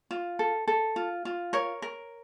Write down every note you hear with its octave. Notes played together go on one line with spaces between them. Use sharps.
F4
A4
A4
F4
F4
A#4 C#5
A#4